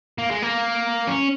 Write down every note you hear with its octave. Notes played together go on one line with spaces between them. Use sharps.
A#3
G#3
A#3
C#4